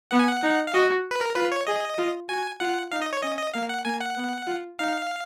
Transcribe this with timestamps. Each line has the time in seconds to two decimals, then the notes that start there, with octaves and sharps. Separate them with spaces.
0.11 B3 F#5
0.19 G#5
0.28 F#5
0.43 D#4
0.67 F5
0.74 F#4 D#5
1.11 B4
1.21 A#4
1.36 F4 B4
1.52 C#5
1.67 G#4 D#5
1.98 F4
2.29 F#4 G#5
2.60 F4 F#5
2.91 D#4 F5
3.02 D#5
3.13 C#5
3.23 C#4 D#5
3.38 D#5
3.54 A#3 F5
3.69 F#5
3.85 A#3 G#5
4.01 F#5
4.17 B3
4.47 F4
4.79 D#4 F5